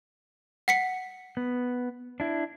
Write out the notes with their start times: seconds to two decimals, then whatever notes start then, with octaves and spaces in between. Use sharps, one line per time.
0.68 F#5 B6 C#7
1.37 B3
2.20 D4 E4